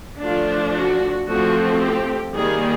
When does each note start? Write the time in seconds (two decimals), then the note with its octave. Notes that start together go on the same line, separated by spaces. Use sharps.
0.23 F3 A3 D4 F4
0.76 F#4
1.29 F3 A3 C4 F#4
1.81 G4
2.34 D#3 G3 A#3 G#4